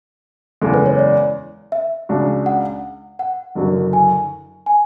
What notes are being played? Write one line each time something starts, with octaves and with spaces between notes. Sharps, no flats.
F#1 E2 C#3 G#3 A4
B4
C#5
D5
E5
C#2 C#3 G#3 D4 F#4
F#5
F#5
F#1 F#2 D3 F#3
G#5
G#5